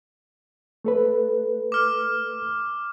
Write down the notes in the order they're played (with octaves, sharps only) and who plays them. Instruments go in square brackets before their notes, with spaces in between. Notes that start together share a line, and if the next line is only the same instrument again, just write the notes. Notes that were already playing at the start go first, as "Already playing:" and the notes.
[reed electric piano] A3 A4 B4
[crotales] D6 F6